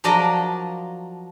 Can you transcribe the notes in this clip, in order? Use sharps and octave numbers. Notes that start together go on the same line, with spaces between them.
F3 F#3 D4 A#4 D5 D#5